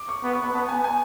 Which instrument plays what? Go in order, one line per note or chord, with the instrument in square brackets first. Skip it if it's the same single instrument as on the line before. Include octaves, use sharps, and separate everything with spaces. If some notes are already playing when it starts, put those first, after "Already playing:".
Already playing: [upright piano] D6
C#6
[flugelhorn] B3 [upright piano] B5
[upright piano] C#6
B5
[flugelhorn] B3 [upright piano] A5
[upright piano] G#5
G#5